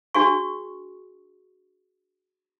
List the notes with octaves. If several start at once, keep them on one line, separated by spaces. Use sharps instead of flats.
D4 F#4 G#4 C#6